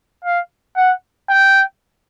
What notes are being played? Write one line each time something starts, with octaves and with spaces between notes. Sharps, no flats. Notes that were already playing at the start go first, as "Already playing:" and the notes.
F5
F#5
G5